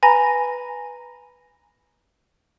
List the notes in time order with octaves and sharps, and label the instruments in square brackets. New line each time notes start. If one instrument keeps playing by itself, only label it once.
[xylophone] B4 G#5 A#5 B5 A#6